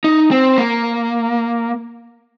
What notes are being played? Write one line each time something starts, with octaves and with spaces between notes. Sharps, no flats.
D#4
C4
A#3